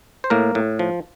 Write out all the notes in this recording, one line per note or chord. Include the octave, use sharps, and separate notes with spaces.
C5
A2 A#3 A#4
A2
F3